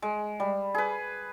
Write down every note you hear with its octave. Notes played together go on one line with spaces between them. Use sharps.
G#3
G3
G#4 B4